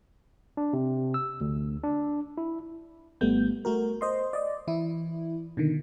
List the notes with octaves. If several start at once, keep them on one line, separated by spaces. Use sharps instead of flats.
D4
C3
E6
D2
D4
E4
G#1 G3 A3 B3 G6
A3 F#4 A#4
C5 D#5 C6
D5 D#5
E3 E4
B2 D3 D#3